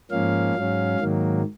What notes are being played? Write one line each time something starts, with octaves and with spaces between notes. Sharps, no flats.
G#2 F3 A#3 C#4 F5
G#2 F#3 C#4
G#2 D#3 F#3 A#3